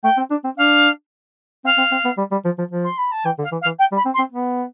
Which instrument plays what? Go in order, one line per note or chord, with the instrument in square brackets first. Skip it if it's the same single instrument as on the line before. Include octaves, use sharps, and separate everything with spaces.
[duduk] A3 [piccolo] G5
[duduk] C4
D4
C4
[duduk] D4 [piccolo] F5
[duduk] C4 [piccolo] F5
[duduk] C4
C4
B3
G3
G3
F3
F3
F3
[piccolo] C6
B5
A5
[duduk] E3 [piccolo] G5
[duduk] D3
[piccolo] F5
[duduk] E3
[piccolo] F5
[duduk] E3
[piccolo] G5
[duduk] G3
[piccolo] B5
[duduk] C4
[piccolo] C6
[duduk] C4
B3